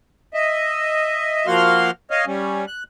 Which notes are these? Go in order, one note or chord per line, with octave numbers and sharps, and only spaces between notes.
D#5 E5
F3 A#3 F#4 F5 C6 F6
C#5 D#5 F5
G3 C#4
F#6